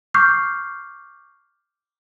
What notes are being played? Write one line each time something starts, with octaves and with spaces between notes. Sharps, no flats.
C#6 D6 F6 G6 C7